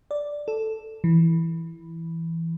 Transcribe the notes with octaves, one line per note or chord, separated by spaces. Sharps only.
D5
A4
E3